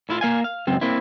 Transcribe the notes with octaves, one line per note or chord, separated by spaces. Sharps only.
A2 E4 F4
A#3 F5 G#5
F5
C#2 F#2 C4
A#3 C4 E4